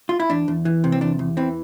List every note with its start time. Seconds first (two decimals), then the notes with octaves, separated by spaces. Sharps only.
0.09 F4
0.20 E4
0.30 E2 D4
0.48 E2
0.65 E3
0.84 C3
0.92 C4
1.01 E2 D4
1.19 E2
1.37 E3 C4